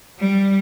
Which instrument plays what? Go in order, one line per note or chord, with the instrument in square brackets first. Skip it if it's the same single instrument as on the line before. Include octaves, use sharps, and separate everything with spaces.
[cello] G3